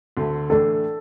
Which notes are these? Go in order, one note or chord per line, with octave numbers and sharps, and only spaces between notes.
D2 D3 A3
A2 E3 A3 D4 A4